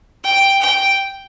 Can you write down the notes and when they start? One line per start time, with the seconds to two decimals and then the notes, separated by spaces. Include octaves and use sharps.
0.25 G5
0.61 G5